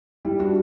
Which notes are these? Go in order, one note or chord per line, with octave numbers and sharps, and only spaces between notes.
G3 E4
D4 F#4